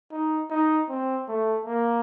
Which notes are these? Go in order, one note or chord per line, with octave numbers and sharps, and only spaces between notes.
D#4
D#4
C4
A3
A#3